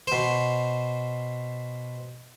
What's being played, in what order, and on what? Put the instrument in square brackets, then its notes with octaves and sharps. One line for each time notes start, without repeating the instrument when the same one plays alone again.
[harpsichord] B2 C5